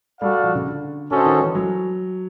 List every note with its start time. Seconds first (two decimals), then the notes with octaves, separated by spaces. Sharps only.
0.21 G3 F#4 A4 D5 F5
0.44 F3
0.55 C#3
0.65 D3
1.10 D3 C#4 F#4 A4 C5 D#5
1.26 D#3
1.41 E3
1.55 F#3